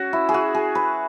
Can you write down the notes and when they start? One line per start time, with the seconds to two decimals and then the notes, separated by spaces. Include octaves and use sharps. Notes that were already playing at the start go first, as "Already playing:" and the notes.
Already playing: C#4 F#4
0.13 E4
0.29 G#4
0.34 F#4
0.54 G#4
0.75 B4